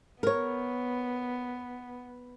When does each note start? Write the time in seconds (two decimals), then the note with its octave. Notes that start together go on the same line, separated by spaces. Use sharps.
0.23 B3 A#4 C#5